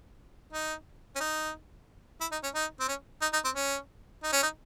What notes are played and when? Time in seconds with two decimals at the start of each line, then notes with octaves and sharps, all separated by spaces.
0.53 D#4
1.16 C#4
1.20 D#4
2.21 E4
2.32 D#4
2.43 C#4
2.55 D#4
2.80 C4
2.88 C#4
3.22 D#4
3.33 D#4
3.45 C4
3.55 C#4
4.23 D#4
4.32 C#4
4.42 D#4